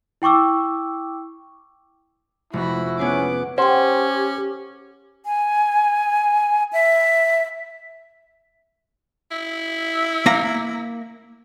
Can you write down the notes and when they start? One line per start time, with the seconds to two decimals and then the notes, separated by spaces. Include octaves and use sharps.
0.22 E4 G5 C#6 D6 E6
2.53 F1 E4 F#4 B5
2.99 B3 C#4 G#4 F#5 D6
3.58 C#4 G4 C5 F#5 G5
5.24 G#5
6.73 E5
9.31 E4
10.26 A#3 A#5